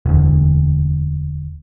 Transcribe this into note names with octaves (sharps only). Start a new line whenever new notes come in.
E1 D2